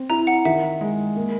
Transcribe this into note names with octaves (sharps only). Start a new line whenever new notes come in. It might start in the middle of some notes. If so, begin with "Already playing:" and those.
Already playing: C4
E4 A#5
F#5
D#3 E5
G#3
A#3